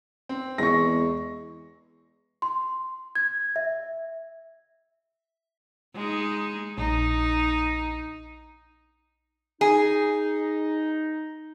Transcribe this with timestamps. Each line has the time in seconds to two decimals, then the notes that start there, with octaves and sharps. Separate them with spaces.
0.29 C4
0.58 E2 G#3 C#6 A#6
2.42 C6
3.15 G#6
3.56 E5
5.95 G#3 D#4
6.78 A#1 D#4
9.61 D#4 G#4